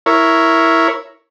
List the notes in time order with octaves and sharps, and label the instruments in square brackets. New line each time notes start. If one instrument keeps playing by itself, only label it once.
[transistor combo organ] E4 A#4 C#5